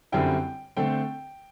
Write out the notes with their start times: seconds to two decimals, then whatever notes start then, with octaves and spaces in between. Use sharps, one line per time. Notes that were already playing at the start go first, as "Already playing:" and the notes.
0.12 F#2 D3 G3 C4 E4 G5
0.77 D3 A3 C4 G5